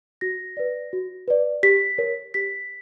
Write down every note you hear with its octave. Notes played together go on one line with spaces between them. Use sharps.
F#4 A#6
B4 D5
F#4
B4 D5
G4 B6
A#4 C#5
G4 B6